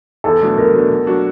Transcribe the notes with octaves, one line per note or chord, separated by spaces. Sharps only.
E2 A4
B2 F#3 A3 D4
E2 A#4
B2 F#3 A3 D4
B2
F#3 A#3 D4 F#4